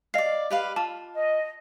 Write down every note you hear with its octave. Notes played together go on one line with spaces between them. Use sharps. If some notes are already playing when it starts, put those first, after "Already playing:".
D5 D#5 F5 C7
G4 B4 F5
F4 A5
D#5